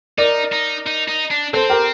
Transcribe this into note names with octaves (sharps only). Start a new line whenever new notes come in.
D#4 A#4 D5
D#4
D#4
D#4
D4
C4 A4 C5
G4 A#4